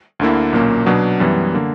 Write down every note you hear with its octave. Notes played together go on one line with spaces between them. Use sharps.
D2 D3 A#3 E4
B1 A#2 A#3 C#4
B2 F#3 B3 D4
F#2 E3 G3 B3
D3 A#3